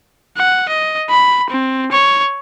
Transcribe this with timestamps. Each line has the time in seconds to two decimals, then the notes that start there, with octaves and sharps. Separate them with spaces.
0.37 F#5
0.69 D#5
1.10 B5
1.50 C4
1.92 C#5